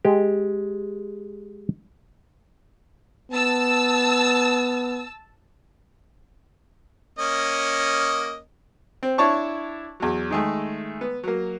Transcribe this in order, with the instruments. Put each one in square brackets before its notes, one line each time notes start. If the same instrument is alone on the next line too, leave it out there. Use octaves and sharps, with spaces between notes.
[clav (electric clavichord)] G#3 G4
[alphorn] B3 [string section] A5 E6
[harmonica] A#3 C#4 D#5
[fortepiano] C4
D4 E4 C#5 D5 A5 C#6
E2 F#3
D#3 G#3 A3
B3
F#3 A#3